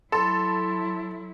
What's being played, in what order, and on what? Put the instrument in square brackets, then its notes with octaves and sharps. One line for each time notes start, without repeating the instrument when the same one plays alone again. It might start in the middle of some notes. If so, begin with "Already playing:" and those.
[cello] F#3 E4 [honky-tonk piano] A4 [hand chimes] B5 C6